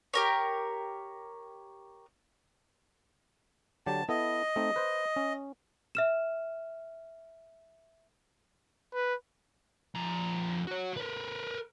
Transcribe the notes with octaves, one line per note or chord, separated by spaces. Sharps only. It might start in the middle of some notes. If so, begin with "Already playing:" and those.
G4 A#4 C#5
D3 F#3 G4 A5
B3 E4 A4 D#5
A3 C4 D#4
B4 C5
C#4
E5 F6 E7
B4
F2 A#5
F#4 C#5
A#4 B4